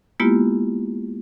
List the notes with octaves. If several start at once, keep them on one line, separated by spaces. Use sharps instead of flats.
G#3 A#3 B3 E4 F4 G4